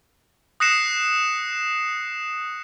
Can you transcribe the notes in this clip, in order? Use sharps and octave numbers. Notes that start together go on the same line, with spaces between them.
D#6 F#6 A#6 C7 C#7 E7